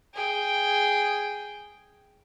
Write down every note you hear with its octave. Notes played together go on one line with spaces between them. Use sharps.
G#4 G5